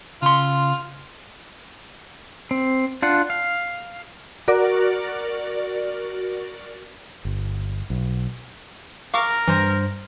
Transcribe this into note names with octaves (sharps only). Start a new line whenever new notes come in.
C#3 F4 C6
C4
D4 F4 F#5
F5
F#4 A#4 D5
G1
B1
A#4 F5 C#6 D6
G2 E3 C5 A#6